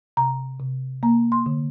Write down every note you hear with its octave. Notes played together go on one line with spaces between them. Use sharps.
C3 A#5
C3
A#3 A#5
C6
D3